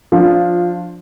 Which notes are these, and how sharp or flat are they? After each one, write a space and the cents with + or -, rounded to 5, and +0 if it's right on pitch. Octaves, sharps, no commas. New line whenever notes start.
F3 +15 D4 +0 F4 +0